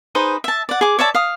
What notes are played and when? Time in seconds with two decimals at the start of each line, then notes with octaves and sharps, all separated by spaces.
0.15 D#4 G#4 B4 C5
0.44 E5 A5
0.69 D5 F#5
0.81 G#4 D6
0.99 C#5 D5 E5 A5
1.15 F5 D#6